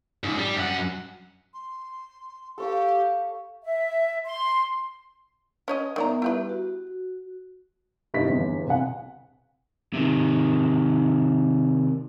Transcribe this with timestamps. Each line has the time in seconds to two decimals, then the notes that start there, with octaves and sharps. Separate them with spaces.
0.24 C#2 G#2
0.39 G3
0.57 F#2 F#5
1.53 C6
2.58 G4 A4 C#5 F5
3.64 E5
4.25 C6
5.68 C#4 C#5 D#5
5.96 D#3 G3 B3 D5 E5 A#5
6.22 E4 G4 B4
6.49 F#4
8.14 F1 G2 D#4 E4 G4 B6
8.27 G1 E2
8.67 C2 F#5
9.94 C3 D#3